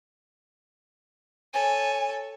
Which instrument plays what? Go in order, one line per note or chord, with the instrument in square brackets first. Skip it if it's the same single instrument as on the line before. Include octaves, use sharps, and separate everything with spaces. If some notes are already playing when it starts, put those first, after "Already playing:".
[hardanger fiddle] A4 C#5 [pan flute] G#5